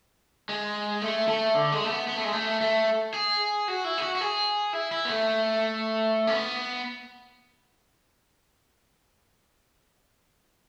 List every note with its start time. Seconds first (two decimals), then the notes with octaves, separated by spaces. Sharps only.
0.49 G#3
1.02 A3
1.28 A3
1.55 D3
1.72 G#3
1.84 A3
1.90 B3
2.08 B3
2.16 A3
2.24 G#3
2.33 A3
2.61 A3
3.14 G#4
3.68 F#4
3.85 E4
3.98 G#4
4.02 F#4
4.16 F#4
4.21 G#4
4.73 E4
4.92 E4
5.05 B3
5.09 A3
6.27 C#4
6.33 B3